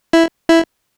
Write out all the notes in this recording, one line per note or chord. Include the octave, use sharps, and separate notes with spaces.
E4
E4